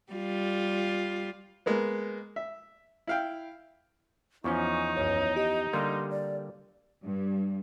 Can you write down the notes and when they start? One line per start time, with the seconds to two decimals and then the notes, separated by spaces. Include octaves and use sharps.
0.13 G3 F4
1.66 G#3 A#3 B3
2.36 E5
3.07 E4 F5 G5
4.44 E2 F3 C#4 D#4 C#6
4.96 C#2 F#2 C#5
5.36 G4 D#5
5.73 D3 G3 A#3 C6
6.11 D5
7.04 G2